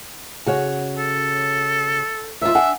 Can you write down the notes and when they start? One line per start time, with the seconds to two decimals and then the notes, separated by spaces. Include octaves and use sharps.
0.46 C#3 F#4 C#5
0.98 A4
2.41 D#2 F4 E5
2.55 D4 F#5 G#5